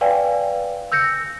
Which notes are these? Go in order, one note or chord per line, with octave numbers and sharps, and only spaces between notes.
B4 D5 F5 G5 G#5
E6 G6 A#6 C#7